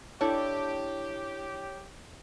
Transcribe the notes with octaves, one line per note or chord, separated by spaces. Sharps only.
D4 E4 G4 A4 C#5